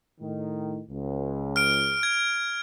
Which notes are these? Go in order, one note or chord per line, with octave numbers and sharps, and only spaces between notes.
A2 D#3
C#2
F6 D7
G#6